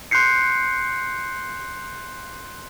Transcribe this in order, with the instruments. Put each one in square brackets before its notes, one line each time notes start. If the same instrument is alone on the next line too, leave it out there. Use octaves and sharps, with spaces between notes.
[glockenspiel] C6 F#6 G6 C7 C#7